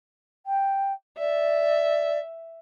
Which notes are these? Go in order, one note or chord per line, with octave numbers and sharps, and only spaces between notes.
G5
D5 E5